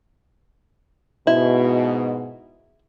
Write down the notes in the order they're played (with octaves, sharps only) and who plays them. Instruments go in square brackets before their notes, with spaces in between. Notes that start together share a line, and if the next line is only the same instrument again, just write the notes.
[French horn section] G#2 B2 [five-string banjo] E4